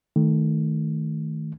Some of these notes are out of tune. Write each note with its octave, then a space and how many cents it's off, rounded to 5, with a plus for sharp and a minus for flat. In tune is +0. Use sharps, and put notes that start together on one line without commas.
D#3 +10 A3 +0